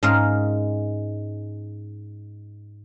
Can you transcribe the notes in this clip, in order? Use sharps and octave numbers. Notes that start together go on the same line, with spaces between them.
G#2 G#3 C#4 A#4 F5